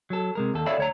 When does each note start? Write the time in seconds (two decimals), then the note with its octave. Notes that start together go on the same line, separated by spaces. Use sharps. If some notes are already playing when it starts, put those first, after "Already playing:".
0.10 F#3 A4
0.35 C3 G#3 A#4
0.54 D#2 A4
0.66 A4 C#5 D5 E5 F5 B5
0.78 D2 C#5 A#5